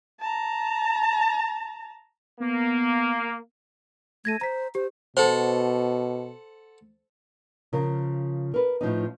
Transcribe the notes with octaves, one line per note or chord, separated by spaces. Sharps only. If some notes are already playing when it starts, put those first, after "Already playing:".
A5 A#5
A#3 B3
A3 G#6 A#6 D#7
C5 A#5 B6
G4 C5
B2 A4 C5 F#5 C6
C#3 F3 A#4
A#4 B4
A2 F3 C#4 D#4